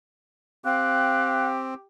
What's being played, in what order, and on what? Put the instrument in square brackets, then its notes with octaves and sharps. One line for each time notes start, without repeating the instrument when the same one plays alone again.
[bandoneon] C4 [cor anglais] G4 [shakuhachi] F5 [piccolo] F#6